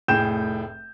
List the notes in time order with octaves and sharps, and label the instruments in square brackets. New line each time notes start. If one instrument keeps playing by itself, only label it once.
[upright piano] F1 A2 G#4 G5 G6 E7